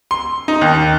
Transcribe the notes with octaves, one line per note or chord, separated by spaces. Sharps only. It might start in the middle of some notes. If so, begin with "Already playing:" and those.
C6
D#4
D#2